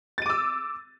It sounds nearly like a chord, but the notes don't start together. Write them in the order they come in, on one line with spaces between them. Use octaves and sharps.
A6 D#7 D6 E6